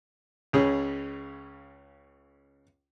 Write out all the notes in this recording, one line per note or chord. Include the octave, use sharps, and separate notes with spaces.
C#2 C#3 C#4 G#4